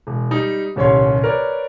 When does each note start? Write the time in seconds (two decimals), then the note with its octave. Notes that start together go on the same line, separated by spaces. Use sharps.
0.07 E1
0.31 G3 D#4
0.76 D#1 C2 C#4 C#5 C6
1.23 A#4 B4 C#5 D5